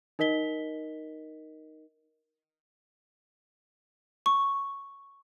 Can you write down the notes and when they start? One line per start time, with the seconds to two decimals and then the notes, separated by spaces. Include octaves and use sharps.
0.19 D#4 A#4 D#5 B6 G7
4.26 C#6